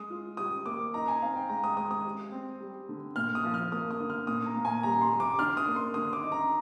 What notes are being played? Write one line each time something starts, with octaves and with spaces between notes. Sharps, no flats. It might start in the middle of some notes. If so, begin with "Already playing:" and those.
Already playing: G#3 D#6
F4
G3 D#6
A#3 D6
D#4 A#5
G#5
C4 F5
G5
G#3 A#5
D#6
G#3 D#6
D#6
G4
C4
G3
D3
A#2 F6
D#6
F3
F6
A#3 D#6
D#6
D3
F6
A#2 D#6
A#5
A#2
G#5
G3 A#5
C6
G3
D6
D4 F6
D#6
A#3
C6
D3 D#6
D6
D#4
A#5